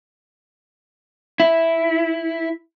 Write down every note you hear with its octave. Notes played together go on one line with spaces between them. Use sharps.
E4